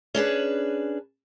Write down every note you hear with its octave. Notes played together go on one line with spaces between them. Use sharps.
C#4 D4 G#4 B4